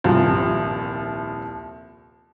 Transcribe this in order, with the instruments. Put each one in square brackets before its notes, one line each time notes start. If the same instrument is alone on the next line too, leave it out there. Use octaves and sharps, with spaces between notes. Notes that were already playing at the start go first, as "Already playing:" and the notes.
[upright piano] D#1 C2 F3 F4